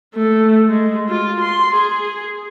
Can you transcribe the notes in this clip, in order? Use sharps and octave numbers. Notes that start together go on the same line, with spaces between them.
A3
G#3
F4
C6
G#4